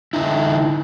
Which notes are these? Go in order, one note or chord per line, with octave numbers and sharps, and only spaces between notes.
D3 D#4 E4